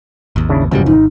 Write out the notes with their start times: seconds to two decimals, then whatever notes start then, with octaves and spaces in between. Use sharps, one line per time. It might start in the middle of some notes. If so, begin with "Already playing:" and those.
0.36 G#1 D#2
0.49 C#3 D4 E4
0.71 G1 C#2 F#2 A2 F3 G3
0.86 G#1 D#4